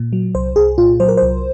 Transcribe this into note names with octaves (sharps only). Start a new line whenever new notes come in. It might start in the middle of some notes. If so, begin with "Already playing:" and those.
Already playing: A#2
F#3
C2 C5
C2 G#4
A#2 F4
F#3 C5
A#4
C2 C5